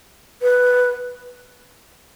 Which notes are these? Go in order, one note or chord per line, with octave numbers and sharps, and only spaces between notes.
B4